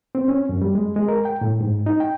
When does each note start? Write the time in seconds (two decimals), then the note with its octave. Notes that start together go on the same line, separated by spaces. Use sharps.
0.15 C4
0.28 C#4
0.49 F#2
0.62 G3
0.75 G#3
0.96 G#3
1.08 A#4
1.25 G5
1.41 A2
1.61 G#2
1.86 D#4
2.00 G5